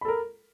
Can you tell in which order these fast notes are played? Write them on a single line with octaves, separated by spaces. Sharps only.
B5 A4 A#4